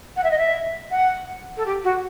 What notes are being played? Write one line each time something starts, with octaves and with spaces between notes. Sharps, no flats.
F#5
E5
D#5
E5
F#5
A4
G4
F#4